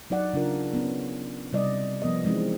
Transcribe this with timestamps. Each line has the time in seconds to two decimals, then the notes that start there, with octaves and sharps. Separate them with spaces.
0.10 F#3 D#4 D5 F#5
0.34 C#3 D4 F4 A#4
0.74 B3 C#4
1.53 C3 G3 D5 D#5
2.02 F3 B3 A#4 D#5
2.25 E3 G#3 C4 D#4